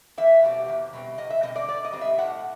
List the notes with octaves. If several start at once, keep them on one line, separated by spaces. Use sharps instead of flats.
E2 E5
B2 G3 C4
E2
B2 G3 C4
E2 D#5
E5
B2 G3 C4 D#5
D5
E2 D5
D#5
B2 G3 C4
E5
A2 F#5